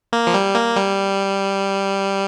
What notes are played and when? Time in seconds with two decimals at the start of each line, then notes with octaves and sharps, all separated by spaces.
0.13 A#3
0.27 F3
0.34 G3
0.55 A#3
0.76 G3